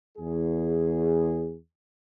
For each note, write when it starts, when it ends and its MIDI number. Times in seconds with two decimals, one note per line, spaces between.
0.18 1.56 40
0.18 1.56 68